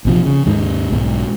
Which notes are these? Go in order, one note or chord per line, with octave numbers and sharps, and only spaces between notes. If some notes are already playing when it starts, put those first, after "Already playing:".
A#1 C3 F3
C#3
D#2 G#2 D#3
B1 G#2